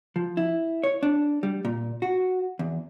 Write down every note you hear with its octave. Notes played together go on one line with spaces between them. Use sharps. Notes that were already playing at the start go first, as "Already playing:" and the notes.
F3
E4
C#5
D4
G3
A#2
F#4
E2